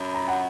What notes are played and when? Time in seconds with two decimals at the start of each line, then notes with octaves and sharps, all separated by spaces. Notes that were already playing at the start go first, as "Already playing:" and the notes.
Already playing: F#2 B5
0.14 A#5
0.28 F#5